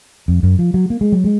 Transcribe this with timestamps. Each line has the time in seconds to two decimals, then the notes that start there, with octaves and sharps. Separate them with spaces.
0.28 F2
0.43 F#2
0.59 F3
0.74 F#3
0.90 A#3
1.01 G#3
1.12 F#3
1.24 G#3